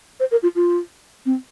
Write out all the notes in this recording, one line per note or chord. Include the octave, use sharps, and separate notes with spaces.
C5
A#4
F4
F4
C4